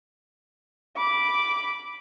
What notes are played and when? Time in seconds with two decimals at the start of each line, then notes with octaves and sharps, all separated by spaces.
0.96 B5 D6